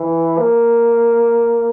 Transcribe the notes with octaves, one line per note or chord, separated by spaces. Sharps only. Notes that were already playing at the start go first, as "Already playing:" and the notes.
Already playing: E3
A#3